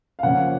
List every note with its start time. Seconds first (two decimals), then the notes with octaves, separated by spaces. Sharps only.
0.19 F5
0.23 C#3 F3 A#3 C#4 F#5